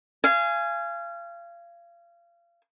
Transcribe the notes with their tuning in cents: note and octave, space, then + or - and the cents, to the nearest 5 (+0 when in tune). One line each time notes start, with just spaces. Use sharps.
F5 -30 G#5 +0